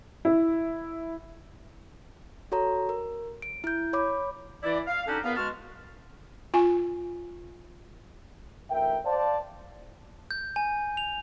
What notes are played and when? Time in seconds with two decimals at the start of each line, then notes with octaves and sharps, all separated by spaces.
0.25 E4
2.52 F#4 A4 C#5 A#5
2.89 A#4
3.42 D7
3.64 E4 G6
3.93 C#5 B5 D6
4.62 E3 E4 D5
4.87 F5
5.06 D3 C#4 D#4 F#4 G4 A4
5.24 E2 B3 A#4 B4 F5
5.36 B2 G#3 F#4 A5 F6
6.54 F4 G#5
8.70 A1 D2 A#4 E5 G5
9.05 C5 D5 F5 A5
10.31 G6
10.56 G#5
10.97 F7